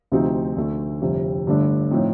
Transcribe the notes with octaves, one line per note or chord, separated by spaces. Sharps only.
D2 C3 F3 C4 D#4
D2 D3 A3
G1 F2 C3 G3
G1 G2 D3 A3 D4
A2 F3 C4 D#4